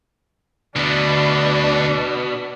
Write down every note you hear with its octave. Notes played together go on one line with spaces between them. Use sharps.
D2 B2 D4